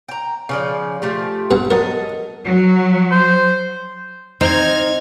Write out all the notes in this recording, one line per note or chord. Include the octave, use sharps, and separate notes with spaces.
G5 A#5
C#3 F3 D5
F3 A3 G4
G2 B2 F#5
F#3 A4 A#4 D#5
F#3
C5
C4 D#4 F6 G#6